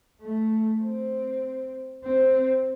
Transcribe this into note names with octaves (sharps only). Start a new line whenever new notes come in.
A3
C4
C4